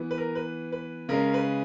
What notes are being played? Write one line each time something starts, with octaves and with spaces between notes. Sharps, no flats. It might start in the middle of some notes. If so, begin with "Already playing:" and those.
Already playing: E3 B3
B4
A#4
B4
B4
C#3 G#3 C#4 A#4
B4